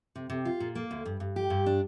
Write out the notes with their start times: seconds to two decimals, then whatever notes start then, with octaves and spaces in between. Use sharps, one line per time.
0.15 C3
0.30 C3
0.45 F4
0.60 A#2
0.75 A#3
0.91 D2
1.05 G2
1.20 G2
1.36 G4
1.50 G2
1.66 D4